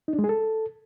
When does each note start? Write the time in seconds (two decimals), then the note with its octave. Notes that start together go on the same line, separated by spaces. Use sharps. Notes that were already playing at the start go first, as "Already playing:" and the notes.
0.08 D#4
0.13 D4
0.19 G#3
0.24 G#4
0.29 A4